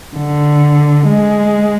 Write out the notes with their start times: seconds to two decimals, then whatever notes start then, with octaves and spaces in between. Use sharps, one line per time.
0.17 D3
1.08 G#3